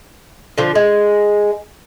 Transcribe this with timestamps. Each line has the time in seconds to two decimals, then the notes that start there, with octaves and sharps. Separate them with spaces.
0.58 D3 F3
0.75 G#3